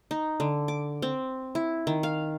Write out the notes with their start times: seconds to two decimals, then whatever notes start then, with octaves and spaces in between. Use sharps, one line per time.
0.11 D#4
0.40 D3
0.68 D6
1.02 C4
1.55 E4
1.87 D#3
2.03 F5